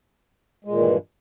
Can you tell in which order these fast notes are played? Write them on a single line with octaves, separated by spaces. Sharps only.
G#3 A#2 D#3 E3 G2